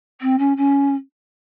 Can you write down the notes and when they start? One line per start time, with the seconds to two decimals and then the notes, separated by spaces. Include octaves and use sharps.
0.21 C4
0.38 C#4
0.57 C#4